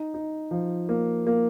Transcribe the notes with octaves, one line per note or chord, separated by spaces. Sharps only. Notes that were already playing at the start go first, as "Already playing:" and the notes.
Already playing: D#4
D#4
F3
A#3
A#3